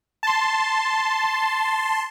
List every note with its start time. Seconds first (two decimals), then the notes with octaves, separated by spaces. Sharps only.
0.23 A5 C6